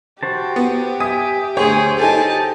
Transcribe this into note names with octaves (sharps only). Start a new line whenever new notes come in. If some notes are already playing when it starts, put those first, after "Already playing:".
F#4 G4 C5 A5
B3
E5 G#5 D#6
D2 G#4 C5 C#5 C6
D#4 G4 A4 G#5 A5